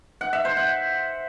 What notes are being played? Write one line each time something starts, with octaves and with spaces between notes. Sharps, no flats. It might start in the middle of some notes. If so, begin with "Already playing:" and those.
F#5
E5
C5
F#5